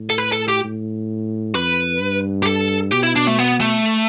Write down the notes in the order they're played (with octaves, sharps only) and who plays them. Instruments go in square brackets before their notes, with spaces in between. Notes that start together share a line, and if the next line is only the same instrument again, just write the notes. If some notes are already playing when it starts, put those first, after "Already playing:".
Already playing: [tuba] A2
[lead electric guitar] A4
B4
A4
G4
[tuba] A2
[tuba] F2 [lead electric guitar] B4
[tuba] G2
[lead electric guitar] G4
A4
[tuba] B2 [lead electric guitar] G4
[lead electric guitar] E4
D4
A3
B3
A3